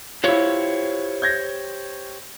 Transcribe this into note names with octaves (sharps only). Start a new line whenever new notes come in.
E4 F4 G4 C5 C#5
G6 G#6 A#6